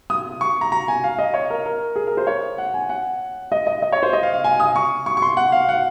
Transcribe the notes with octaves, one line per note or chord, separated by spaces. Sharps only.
D#6
C#6
A#5
A#5
G#5
F5
D#5
C#5
A#4
A#4
G#4
A#4
C5
C#5
F#5
G#5
F#5
D#5
D#5
D#5
C#5
C5
D#5
F5
F5
G#5
D#6
C#6
C#6
C#6
C6
F#5
F5
F#5